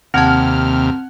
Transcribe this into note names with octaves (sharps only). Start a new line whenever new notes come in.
D#2 C3 C4 F#5 A5 F6 G#6